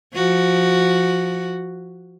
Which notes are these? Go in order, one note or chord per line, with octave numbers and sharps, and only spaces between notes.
F3 F#4